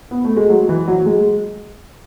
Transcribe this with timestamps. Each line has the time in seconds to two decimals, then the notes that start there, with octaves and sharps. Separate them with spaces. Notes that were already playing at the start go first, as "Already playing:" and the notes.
0.11 B3
0.25 A3
0.37 G#3
0.49 F#3
0.69 E3
0.88 F#3
1.06 G#3